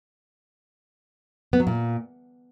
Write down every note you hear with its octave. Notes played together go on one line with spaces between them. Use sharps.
B3
F#3
A#2